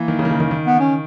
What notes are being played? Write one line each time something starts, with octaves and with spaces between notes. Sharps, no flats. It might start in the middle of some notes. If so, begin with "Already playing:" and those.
Already playing: E3 A#3
D#3
C#3
D#3
C#3
D#3
D#3
B3
C#4